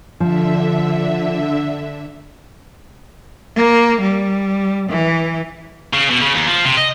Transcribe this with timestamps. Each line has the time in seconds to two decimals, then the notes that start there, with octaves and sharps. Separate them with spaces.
0.20 D3 F3 E5
3.56 A#3
4.01 G3
4.90 E3
5.94 C#3
6.10 B2
6.22 C#3
6.35 D#2
6.47 F3
6.65 C3
6.77 D#5